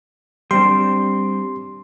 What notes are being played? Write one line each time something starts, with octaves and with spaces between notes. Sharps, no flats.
G3 C4 D4 C6